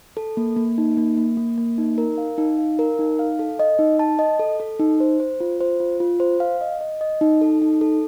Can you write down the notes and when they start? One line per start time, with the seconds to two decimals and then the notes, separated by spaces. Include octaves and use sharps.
0.17 A4
0.37 A#3
0.57 A#3
0.78 D#4
0.97 A#3
1.18 A#3
1.37 A#3
1.58 A#3
1.78 D#4
1.98 A#4
2.18 F5
2.38 D#4
2.58 F5
2.79 A#4
2.99 D#4
3.19 F5
3.39 A4
3.59 D#5
3.79 D#4
3.99 A5
4.19 D#5
4.39 A4
4.60 A4
4.80 D#4
5.00 C5
5.20 C5
5.40 F4
5.61 C5
5.80 F4
6.00 F4
6.20 C5
6.40 F5
6.61 D#5
6.81 D#5
7.01 D#5
7.21 D#4
7.41 A4
7.62 D#4
7.81 A4